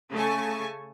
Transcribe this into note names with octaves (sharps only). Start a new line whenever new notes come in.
C#3 A3 G#5 A5 C#6